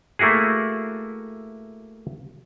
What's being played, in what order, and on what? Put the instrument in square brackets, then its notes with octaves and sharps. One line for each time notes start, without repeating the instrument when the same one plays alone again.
[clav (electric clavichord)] A3 A#3 E4 F#4 G#4